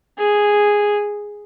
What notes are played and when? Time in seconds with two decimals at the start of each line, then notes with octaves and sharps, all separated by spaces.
0.19 G#4